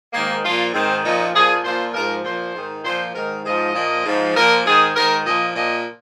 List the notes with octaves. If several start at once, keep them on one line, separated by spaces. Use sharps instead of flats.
G#2 D#3 A#3
A#2 F3 F4
G#2 D#3 C4
A#2 F3 D#4
A#2 F3 G#4
A#2 F3 C5
G#2 F3 A#4
A#2 F3 C5
G#2 D#3
A#2 F3 C5
G#2 D#3 A#4
G#2 F3 D#5
A#2 F3
G#2 F3
A#2 F3 A#4
G#2 D#3 G#4
G#2 D#3 A#4
A#2 F3 D#5
A#2 F3 D#5